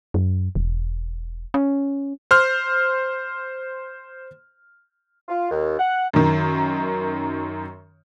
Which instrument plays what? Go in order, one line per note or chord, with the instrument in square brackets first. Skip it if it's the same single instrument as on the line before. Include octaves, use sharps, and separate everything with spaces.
[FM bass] F#2
E1
C#4
[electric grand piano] C5 C6 F6
[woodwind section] F4
D#2
F#5
[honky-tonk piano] F#2 D#3